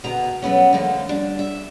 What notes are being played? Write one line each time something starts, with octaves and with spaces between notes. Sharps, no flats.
D2 B2 B3 A#5
F#3 A3 B3 C#4
D3 F3 A3 A#3
G3 D4
E5